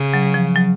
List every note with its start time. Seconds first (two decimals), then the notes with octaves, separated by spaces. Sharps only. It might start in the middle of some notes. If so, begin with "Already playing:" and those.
Already playing: C#3
0.14 F#3
0.34 F3
0.56 F#3